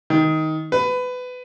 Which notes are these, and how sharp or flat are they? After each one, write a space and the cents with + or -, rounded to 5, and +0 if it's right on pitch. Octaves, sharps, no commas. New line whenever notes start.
D#3 +15
B4 +20